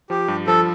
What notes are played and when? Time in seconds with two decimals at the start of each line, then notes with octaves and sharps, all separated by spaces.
0.10 F3 G4
0.28 G2
0.47 F3 A4